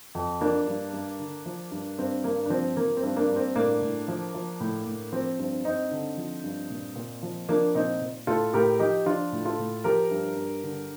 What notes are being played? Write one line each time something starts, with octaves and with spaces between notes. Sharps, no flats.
F2
F3 A#3 D4
G2
G2
D3
F3
G2
G2 C4
G2 A#3
D4
F3 C4
F3 A#3
C4
G2
A#3 D4
G2
C4
A2 A#3 D4
A2
F3
F3
A2
A2
F3 C4
G2 C4
G2 C4 D#4
D3
F3
G2
A#2
A#2
F3
F3 A#3 D4
A#2 C4 D#4
A#2
A2 F4 A4
A2 G4 A#4
F3 D#4 G4
F3 D4 F4
A2
F4 A4
A2
F3 G4 A#4
G2
G2
D3